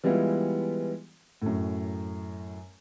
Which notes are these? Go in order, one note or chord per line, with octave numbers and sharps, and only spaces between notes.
E3 G3 G#3 B3 E4 F4
F#2 A2